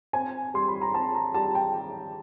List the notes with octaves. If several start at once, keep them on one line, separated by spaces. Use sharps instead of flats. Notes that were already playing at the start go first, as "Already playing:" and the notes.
C4 G#5
G3 C6
B5
A#5
C4 A5
A#5
G3 A5
G5